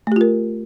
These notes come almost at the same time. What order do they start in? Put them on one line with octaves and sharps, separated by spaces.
A3 G4 F4 A#4